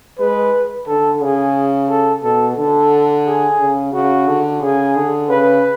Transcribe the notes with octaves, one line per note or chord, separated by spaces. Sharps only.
G#3 B4
D3 A4
C#3 G#4
A4
B2 A4
D3 A4
G#4
C#3
C#3 F#4
D3
C#3 G#4
D3
C#3 B4